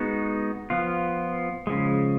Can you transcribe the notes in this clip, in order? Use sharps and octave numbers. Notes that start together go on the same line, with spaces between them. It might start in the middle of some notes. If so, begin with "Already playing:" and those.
Already playing: G#3 B3 D#4 F#4
F3 B3 F4
C#3 F3 G#3